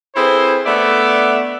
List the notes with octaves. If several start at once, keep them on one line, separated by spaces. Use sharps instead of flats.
C4 E4 G#4 A4 B4 C5
A3 B3 D4 D5 E5